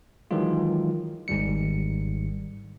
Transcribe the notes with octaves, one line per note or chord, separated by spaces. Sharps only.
D#3 E3 F#3 G#3 F4
G#1 G#2 D#3 G3 C#7